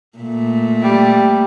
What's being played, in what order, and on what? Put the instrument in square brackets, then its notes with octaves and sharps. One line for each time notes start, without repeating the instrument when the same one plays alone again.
[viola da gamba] A#2 A3
[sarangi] G3